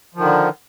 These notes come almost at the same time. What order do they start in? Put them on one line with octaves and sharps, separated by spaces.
F3 D#3 D3